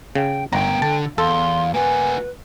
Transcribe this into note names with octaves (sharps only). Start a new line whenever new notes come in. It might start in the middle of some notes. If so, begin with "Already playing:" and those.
C#3 G5
G1 B3 A#4 G5 A#5
D3 A4 A5
E2 A4 F5 C6
A#3 F#4 B4 G#5